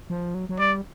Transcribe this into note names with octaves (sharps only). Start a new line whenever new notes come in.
F3
F#3
F#3
G3 D5